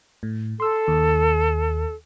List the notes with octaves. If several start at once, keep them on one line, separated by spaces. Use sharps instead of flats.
A2
A4 C6 E6
D#2 D#3